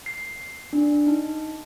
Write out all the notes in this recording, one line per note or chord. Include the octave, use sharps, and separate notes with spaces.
C7
D4
D#4